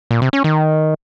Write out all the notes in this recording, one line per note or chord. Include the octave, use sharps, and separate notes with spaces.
A#2
C3
C#4
D#3